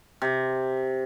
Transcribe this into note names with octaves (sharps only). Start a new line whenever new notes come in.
C3